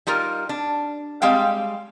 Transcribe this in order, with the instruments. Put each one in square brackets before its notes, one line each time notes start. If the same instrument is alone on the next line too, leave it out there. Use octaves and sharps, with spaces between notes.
[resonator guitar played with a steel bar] G3 D#4 F4 A#4
D4
G3 G#3 C4 F5 G5